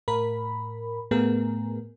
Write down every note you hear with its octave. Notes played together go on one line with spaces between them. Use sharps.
A2 A#4 B5
A2 A3 B3 G#4 A#4